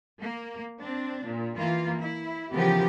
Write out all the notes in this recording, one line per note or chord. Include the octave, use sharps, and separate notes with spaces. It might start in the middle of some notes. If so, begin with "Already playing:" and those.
A#3
C4 D4
A#2
E3 A#3 F4
E4
C#3 E3 F3 B3 G4 A#4